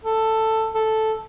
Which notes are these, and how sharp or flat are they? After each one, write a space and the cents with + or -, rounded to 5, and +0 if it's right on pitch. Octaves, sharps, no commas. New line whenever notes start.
A4 +10
A4 -5